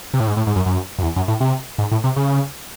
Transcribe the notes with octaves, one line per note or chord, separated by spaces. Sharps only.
C3
A2
G#2
A2
G#2
F#2
F#2
F#2
E2
F#2
A2
C3
G#2
A2
C3
C#3